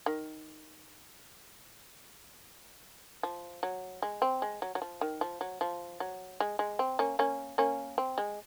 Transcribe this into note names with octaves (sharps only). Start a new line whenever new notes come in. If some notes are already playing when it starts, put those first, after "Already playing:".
D#3
F3
F#3
G#3
C4
G#3
F#3
F#3
F3
D#3
F3
F#3
F3
F#3
G#3
G#3
C4
A#3 C#4
A#3 C#4
A#3 C#4
C4
G#3